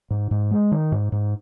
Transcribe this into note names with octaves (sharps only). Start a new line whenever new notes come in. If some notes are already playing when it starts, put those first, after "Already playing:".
G#2
G#2
G#3
D#3
G#2
G#2